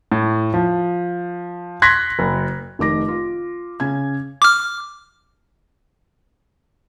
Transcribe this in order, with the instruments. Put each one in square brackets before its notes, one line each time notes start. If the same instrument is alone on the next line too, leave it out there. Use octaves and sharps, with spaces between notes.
[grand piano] A2
F3
C6 F#6 G#6 A#6 B6
F#1
[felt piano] F1 D#3 D6 A#6
F4
C#3 C#4 G#6
[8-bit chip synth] D6 F6